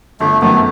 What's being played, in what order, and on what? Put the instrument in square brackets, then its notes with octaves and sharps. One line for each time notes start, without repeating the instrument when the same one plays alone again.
[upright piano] G1 [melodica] A3
[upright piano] F#2 D#3 F#3 B3 [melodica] A3